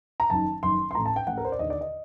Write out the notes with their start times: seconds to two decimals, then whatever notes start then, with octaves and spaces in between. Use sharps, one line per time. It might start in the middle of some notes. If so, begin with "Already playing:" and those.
0.20 A#5
0.30 F#1 F#2 D#3 A5
0.63 F#1 F#2 D#3 C6
0.91 C6
0.95 A2 A#5
0.99 A1
1.05 A5
1.16 G5
1.27 A1 A2 F#5
1.37 A#4
1.45 C5
1.52 D5
1.59 D#2 D3 D#5
1.70 D5
1.81 D#5